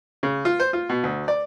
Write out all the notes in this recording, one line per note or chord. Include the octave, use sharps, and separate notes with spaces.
C#3
F4
C5
F4
B2
D2
D5